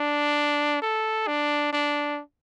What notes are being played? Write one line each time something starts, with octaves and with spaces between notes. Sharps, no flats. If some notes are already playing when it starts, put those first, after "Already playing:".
Already playing: D4
A4
D4
D4